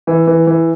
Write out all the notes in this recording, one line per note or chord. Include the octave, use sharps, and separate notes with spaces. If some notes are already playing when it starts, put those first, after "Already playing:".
E3
E3
E3